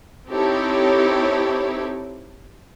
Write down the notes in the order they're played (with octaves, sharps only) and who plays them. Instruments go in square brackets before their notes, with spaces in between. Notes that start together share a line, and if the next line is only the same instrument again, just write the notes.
[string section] C4 D#4 E4 G4 A4 C#5